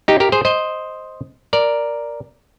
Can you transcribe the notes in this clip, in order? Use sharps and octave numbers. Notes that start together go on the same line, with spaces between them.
D#4 G4
G4 A#4
G#4 C5
C5 D#5
A#4 D5